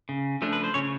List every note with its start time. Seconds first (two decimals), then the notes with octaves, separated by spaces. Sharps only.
0.09 C#3
0.42 F3 A3 D4
0.53 B4
0.64 C5
0.74 C#3 C#4 C#5